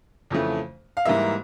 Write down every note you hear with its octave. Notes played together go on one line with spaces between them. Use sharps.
F2 C#3 E3 A3
F5
G#2 E3 G3 A#3 E5